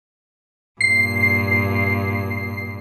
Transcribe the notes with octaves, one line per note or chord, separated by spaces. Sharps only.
G2 A#2 C7